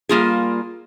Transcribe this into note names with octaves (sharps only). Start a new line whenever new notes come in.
G3 A#3 F4 G#4